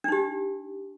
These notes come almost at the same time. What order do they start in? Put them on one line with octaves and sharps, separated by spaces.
D4 D#4 G4